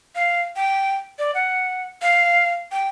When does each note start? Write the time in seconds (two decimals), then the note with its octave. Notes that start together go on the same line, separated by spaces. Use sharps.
0.15 F5
0.56 G5
1.19 D5
1.35 F#5
2.02 F5
2.72 G5